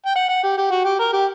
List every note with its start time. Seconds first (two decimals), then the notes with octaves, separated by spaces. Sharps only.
0.06 G5
0.16 F#5
0.29 F#5
0.43 G4
0.58 G4
0.71 F#4
0.85 G4
0.99 A#4
1.13 G4